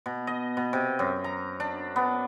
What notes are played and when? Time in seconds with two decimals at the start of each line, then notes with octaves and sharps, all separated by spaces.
0.06 B2
0.27 D#5
0.57 B2
0.73 C3
0.99 F#2
1.24 A#5
1.60 D4
1.96 B3